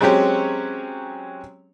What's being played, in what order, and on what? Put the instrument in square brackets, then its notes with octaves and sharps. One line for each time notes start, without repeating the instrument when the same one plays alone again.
[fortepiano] F#3 G#3 C4 C#4 G4 C#5